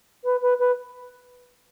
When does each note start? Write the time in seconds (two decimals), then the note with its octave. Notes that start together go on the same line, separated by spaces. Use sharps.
0.24 B4
0.41 B4
0.59 B4